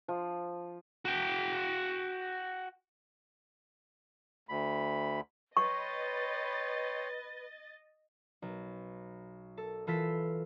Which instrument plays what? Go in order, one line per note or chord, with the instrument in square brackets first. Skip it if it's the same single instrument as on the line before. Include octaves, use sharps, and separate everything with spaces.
[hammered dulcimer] F3
[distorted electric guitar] F#4 G5
[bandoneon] D2 B5
[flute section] B4 [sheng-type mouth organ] C#5 G5 C6 [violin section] D#5 A6 [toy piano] C#6
[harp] B1
A4
E3 F4 A4 E6 B6